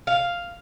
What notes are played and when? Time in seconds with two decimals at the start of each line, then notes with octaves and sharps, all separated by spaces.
0.07 F5